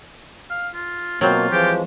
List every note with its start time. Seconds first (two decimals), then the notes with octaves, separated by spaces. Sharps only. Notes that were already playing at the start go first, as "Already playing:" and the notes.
0.50 F5
0.75 F4
1.21 B2 F#3 A#3 C4 F4
1.52 E3 F3 G#3 G4